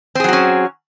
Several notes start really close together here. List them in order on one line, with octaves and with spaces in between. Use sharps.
C4 G#4 F#3 F#4 C#4